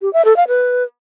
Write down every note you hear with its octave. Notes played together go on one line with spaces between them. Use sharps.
G4
E5
A4
F5
B4